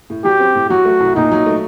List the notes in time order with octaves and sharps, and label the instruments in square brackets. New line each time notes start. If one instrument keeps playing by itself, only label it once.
[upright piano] A2
[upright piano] F#3 [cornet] G4
[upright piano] C4
A2
[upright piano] F#3 [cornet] F#4
[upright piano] A3
C2
[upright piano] A#2 [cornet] D#4
[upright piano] F#3
A3